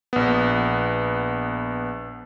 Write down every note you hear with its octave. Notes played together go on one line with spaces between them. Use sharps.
A#1 B3